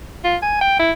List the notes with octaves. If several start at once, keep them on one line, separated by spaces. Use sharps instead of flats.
F4
G#5
G5
E4